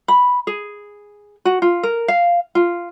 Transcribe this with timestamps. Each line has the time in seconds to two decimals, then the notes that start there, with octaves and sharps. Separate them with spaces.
0.08 B5
0.47 G#4
1.45 F#4
1.62 F4
1.83 A#4
2.08 F5
2.55 F4